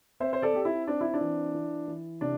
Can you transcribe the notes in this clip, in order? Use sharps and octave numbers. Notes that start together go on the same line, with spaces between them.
C4 C5 E5
C5
A4 D5
C4 G4
E4
C4 D4
E4
D4
E3
E3
E3
C3 D4